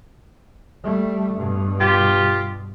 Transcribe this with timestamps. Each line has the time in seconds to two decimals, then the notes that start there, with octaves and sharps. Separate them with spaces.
0.84 G3 A3
1.35 G2 B2
1.80 F4 G4